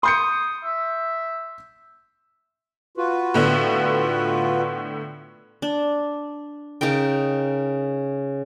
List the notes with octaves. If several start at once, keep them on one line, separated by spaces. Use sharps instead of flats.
C6 D#6 G6 C#7
E5
F4 F#4 B4
A2 D3 B3
D4
C#3 D#4 A#4 G5